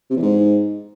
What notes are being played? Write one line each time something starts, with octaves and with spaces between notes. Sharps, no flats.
C3
E2
G#2